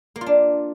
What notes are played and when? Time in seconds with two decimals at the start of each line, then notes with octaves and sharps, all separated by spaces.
0.16 A#3
0.21 F4
0.26 D4